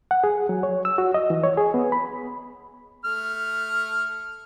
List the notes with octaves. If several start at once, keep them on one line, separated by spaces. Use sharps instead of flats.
F#5
G#4
F#3
C#5
E6
F#4
D#5
E3
C#5
G#4
B3
B5
A3 F6